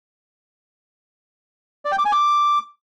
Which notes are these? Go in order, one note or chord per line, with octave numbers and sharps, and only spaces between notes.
D5
G5
D6
G#5
D6